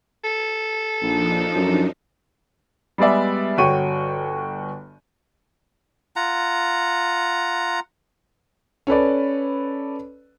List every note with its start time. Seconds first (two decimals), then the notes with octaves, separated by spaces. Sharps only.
0.24 A4
1.02 A#1 F3 D4 D#4
1.56 F#2
2.98 G3 G#3 B3 G#4 D5 E5
3.58 G1 F#4 C#5 G5 C#6 D#7
6.16 F4 F#5 A#5
8.87 C#4 A4 B4 D5